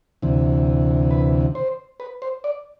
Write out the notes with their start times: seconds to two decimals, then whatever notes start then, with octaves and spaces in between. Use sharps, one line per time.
0.22 D2 C3 E3
1.11 B4
1.55 C5
2.00 B4
2.22 C5
2.44 D5